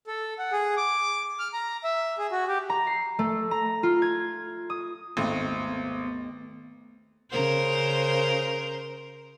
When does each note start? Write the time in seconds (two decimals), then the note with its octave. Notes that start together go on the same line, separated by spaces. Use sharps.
0.07 A4
0.39 F#5
0.52 G#4
0.77 D6
1.39 F6
1.53 A#5
1.84 E5
2.18 G#4
2.32 F#4
2.48 G4
2.70 A#5
2.87 C7
3.19 A3
3.51 A#5
3.83 F4
4.02 G#6
4.70 D#6
5.17 G#1 D#2 A3 B3 C4
7.31 C#3 A#4 C5